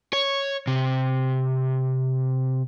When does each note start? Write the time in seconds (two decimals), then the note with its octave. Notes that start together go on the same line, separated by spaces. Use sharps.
0.13 C#5
0.67 C3